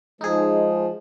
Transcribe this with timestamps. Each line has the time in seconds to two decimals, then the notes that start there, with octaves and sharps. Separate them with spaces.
0.21 F3 G#3 D#4 G#4